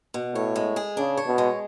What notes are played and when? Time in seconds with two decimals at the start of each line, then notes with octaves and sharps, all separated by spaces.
0.14 B2
0.35 A2 C#5
0.56 G#3
0.76 G#4
0.97 C#3 D4
1.17 C#5
1.27 B2
1.38 G#3